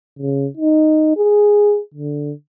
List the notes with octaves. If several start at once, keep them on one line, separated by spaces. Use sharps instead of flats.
C#3
D#4
G#4
D3